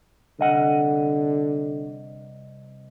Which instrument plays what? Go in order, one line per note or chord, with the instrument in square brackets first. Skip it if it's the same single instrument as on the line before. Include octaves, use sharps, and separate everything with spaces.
[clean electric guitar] C2 D#5 F#5 [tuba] D3